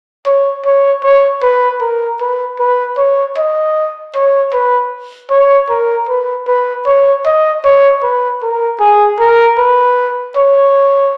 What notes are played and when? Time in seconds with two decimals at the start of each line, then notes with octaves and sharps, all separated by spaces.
0.26 C#5
0.65 C#5
1.03 C#5
1.42 B4
1.81 A#4
2.20 B4
2.59 B4
2.97 C#5
3.37 D#5
4.15 C#5
4.53 B4
5.30 C#5
5.69 A#4
6.09 B4
6.47 B4
6.86 C#5
7.25 D#5
7.64 C#5
8.03 B4
8.42 A#4
8.80 G#4
9.19 A#4
9.58 B4
10.36 C#5